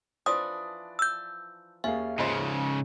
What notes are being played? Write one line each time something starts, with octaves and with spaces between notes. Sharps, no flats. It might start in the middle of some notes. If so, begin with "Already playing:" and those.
E3 F3 D4 B4 D5 D#6
E6 G6
D#2 A#3 C#4 G#4 E5
G#2 C#3 F3 D#4 B4